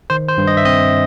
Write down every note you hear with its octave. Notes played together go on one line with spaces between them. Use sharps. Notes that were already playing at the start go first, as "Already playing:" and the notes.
D#3 C5
C5
G2
D#5
E5
C4 D#5